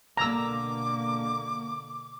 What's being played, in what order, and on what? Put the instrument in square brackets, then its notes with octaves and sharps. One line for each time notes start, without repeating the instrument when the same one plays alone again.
[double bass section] B2 D3 A#3 [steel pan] A#5 E6 [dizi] D6